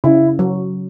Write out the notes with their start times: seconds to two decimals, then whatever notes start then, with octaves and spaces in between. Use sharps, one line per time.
0.04 C#3 E4
0.39 F#3